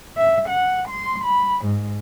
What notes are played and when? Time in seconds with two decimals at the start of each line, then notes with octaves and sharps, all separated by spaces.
0.18 E5
0.48 F#5
0.89 C6
1.25 B5
1.65 G#2